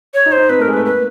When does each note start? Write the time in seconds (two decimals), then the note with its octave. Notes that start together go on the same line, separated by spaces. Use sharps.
0.14 C#5
0.26 D#4
0.32 C5
0.38 D#4
0.49 C4 B4
0.59 A3 A#4
0.67 G#3
0.73 A3 B4
0.85 A#3 B4